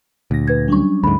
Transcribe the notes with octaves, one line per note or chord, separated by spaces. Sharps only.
D2 A#2 A#6
B4 G#6
F#3 G3 C#4 D4 C#6
D2 G#2 B5